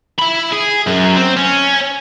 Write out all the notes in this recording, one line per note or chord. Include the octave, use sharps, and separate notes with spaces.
E5 B5
G#4
F#2
C4
C#4